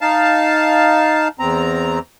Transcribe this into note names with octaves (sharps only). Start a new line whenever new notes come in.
D#4 F5 A5
E2 C4 A#5